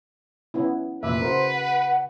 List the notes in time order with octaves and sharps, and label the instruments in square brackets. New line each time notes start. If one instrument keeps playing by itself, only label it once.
[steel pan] B3 C#4 E4
[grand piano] F1 A#2 D6 [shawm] B4 [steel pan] E5
[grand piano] C#3 F#4 [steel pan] A#4 [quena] C5
[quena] F#5